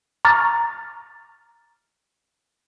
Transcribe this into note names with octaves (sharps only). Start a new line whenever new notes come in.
A#5 C#6 D6 F6 A6